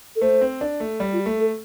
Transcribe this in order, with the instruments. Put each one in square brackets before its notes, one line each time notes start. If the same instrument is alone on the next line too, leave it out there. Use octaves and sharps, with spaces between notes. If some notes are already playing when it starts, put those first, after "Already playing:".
[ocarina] A4
[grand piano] A3 [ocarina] C5
[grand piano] C4
D4
A3
G3
[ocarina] F4
G4
[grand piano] A3
[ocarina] A4